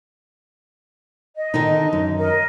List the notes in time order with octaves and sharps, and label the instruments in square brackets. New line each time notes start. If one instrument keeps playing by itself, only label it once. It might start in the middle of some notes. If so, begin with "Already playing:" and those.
[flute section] D#5
[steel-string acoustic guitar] D3 D#3 D#4
F#2
[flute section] A#4 D#5